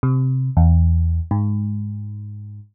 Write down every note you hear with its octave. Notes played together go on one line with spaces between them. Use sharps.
C3
E2
G#2